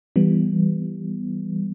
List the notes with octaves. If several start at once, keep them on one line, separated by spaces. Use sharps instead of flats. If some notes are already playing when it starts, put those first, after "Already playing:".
E3 G3 B3